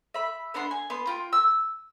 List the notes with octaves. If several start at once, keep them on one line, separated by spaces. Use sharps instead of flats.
E5 B5
B3 D4 F#5 C6
G#5
B3 C6
F4 G5
E6